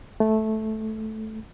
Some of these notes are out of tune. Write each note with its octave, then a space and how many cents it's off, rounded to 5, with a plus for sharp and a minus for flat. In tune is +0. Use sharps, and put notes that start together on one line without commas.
A3 -10